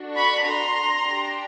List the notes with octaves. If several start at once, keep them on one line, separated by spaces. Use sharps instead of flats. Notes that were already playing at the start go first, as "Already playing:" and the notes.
Already playing: D4 F#4 A4
B5 C#6
A#5 C6
D4 G4